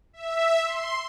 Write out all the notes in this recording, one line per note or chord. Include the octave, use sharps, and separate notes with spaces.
E5
C6